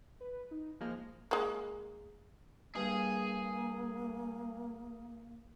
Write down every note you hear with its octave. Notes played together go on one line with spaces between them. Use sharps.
B4
D#4
F3 G#3 A#3 F6
G#3 A#3
G2 A#3 G#4